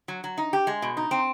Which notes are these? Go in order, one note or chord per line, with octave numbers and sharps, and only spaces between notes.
F#3
F#3
D#4
G4
G#3
B2
D#4
C4